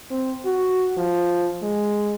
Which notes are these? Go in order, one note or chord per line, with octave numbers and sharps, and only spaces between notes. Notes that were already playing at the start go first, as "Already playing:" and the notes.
C4
F#4
F3
G#3